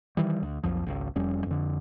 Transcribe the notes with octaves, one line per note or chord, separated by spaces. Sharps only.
D#3 E3 G3
D2
B1 F2 F3
G#1 C#2
F1 F2 G3 C#4
F2 D3